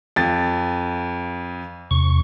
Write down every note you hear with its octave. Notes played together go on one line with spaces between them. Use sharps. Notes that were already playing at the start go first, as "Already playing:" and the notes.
F2 A6
E2 C3 C#6